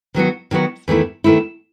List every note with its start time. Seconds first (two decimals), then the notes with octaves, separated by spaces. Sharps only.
0.14 D#3 F#3 B3 F#4
0.51 D#3 F#3 B3 F#4
0.88 E2 D#3 A3 E4
1.24 E2 D#3 A3 E4